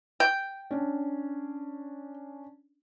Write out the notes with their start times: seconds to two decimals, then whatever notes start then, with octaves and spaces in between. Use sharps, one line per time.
0.20 G5
0.71 C#4 D4